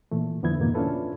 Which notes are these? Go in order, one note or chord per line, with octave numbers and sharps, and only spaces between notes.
A#2 E3 A3
F2 D3 F3 B3 E4 G#6
F2 G#2 B2 D#3 A#3 D#4
C#4 D4 E4 F4 A4 B4